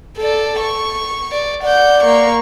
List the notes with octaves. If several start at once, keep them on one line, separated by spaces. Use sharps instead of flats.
A4 D5
C#6
D5
D5 F#5 G6
A#3 C#6